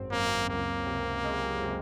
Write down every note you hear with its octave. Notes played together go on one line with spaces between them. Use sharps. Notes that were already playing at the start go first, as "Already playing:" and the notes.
Already playing: G#1 F#2 C4
F#2 A#3
C#2 A#3
C3
G#3
C3